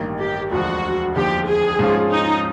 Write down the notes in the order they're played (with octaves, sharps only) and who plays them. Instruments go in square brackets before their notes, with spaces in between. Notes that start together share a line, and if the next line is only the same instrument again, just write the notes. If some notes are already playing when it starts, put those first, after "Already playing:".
Already playing: [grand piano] A1 G2 D#3 G3 A#3
[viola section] G4
[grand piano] E1 D2 D3 F3 [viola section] F#4
[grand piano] F1 D#2 D3 F3 [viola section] G4
[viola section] G#4
[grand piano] G#2 F3 G#3 C#4 F4
[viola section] D#4